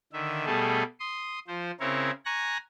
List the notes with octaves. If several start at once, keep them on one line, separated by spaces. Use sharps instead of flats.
D3 D#3 E5
B2 G3 A3 G#4 A4
C6 D#6
F3 C5
C#3 C4 E4 A#4 C#5
G#5 A#5 C#6 F#6 A#6